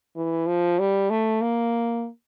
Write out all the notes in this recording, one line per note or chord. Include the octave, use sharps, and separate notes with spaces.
E3
F3
G3
A3
A#3